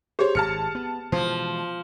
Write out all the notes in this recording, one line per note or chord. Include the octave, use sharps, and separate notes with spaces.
G4 G#4 C5 C#5
G#1 G#2 A5 F6 C#7
B3
B2 E3 F3 G#3